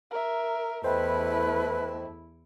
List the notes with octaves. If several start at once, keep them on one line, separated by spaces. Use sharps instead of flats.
A#4 E5
E2 A3 E4 B4 C5 D#5 G5